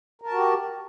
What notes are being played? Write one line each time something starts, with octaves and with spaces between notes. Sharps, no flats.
F#4 G4 A#4 A5